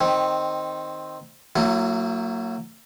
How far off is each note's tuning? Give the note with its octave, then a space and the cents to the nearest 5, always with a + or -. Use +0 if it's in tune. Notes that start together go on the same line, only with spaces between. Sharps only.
D#3 +0 C4 +5
F#3 +0 A#3 -30 E4 +35